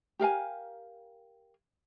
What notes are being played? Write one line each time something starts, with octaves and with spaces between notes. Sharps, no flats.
G4 A#4 F5 G#5